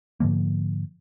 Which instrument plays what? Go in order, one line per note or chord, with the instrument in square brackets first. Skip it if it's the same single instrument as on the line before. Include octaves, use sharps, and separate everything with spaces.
[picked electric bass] G#2 D3 F3 A#3